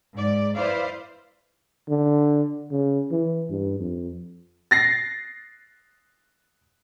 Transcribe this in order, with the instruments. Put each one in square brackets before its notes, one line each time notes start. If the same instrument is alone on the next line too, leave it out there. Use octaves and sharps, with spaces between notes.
[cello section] G#2 D5
E4 B4 C5 D5 F5
[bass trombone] D3
C#3
E3
G2
F2
[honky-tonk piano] A6 A#6 C7